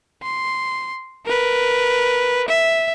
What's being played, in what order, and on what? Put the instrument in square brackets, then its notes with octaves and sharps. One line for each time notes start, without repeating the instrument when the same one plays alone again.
[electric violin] C6
A#4 B4
E5